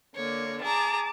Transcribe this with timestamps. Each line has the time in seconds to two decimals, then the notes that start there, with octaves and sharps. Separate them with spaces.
0.15 D3 A#3 C#5
0.62 G#4 A5 A#5 D6